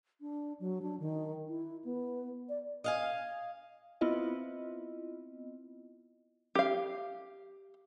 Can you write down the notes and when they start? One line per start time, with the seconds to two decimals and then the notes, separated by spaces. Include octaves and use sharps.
0.21 D4
0.60 F#3
0.82 D4
1.00 D#3
1.49 E4
1.84 B3
2.49 D5
2.84 D#5 F5 G#5
4.01 B3 C4 E4 F4 D#5
6.55 G4 F5